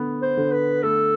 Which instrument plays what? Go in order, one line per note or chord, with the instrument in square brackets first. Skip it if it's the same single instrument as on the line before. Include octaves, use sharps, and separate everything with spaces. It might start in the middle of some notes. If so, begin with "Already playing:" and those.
Already playing: [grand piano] D3 B3
[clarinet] C5
[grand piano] D3
[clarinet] B4
[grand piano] A3 [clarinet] A4